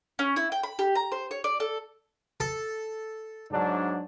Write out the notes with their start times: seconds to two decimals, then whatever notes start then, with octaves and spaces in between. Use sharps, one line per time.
0.19 C#4
0.36 E4
0.52 G5
0.63 B5
0.79 G4
0.95 A#5
1.12 C5
1.31 C#5
1.44 D5
1.60 A4
2.40 A4
3.51 G#2 F#3 D4